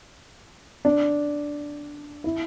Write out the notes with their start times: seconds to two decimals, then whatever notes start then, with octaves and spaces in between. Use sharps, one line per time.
0.85 D4
2.24 E4